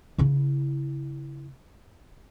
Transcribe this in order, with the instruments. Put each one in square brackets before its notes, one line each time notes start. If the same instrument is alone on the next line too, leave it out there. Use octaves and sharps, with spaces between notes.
[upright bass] C#3 E4